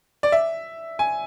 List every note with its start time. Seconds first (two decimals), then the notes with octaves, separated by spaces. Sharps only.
0.23 D5
0.32 E5
0.99 G#5